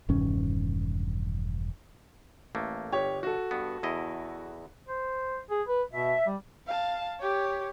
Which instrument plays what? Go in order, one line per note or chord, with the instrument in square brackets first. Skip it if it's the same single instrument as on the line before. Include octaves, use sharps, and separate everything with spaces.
[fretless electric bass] E1 G2 D#3 C#4
[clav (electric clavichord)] A1 A3 A#3
[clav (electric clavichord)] G1 [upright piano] G4 C#5
[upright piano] F#4 A4
[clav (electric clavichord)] G2 B3
E2 E4 D#5
[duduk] C5
G#4
B4
[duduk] B2 [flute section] E5
[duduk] G3
[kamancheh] F5 A5
G4 C#5